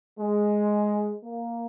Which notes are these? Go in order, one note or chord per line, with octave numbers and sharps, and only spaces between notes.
G#3
A#3